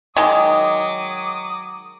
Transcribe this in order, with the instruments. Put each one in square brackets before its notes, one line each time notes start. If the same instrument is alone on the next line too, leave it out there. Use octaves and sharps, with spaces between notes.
[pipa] D#3 G#3 [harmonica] F#3 D6 D#6